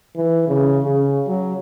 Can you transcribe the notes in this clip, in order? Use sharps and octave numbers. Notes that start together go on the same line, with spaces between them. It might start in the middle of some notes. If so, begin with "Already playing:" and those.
E3
C#3
C#3
F#3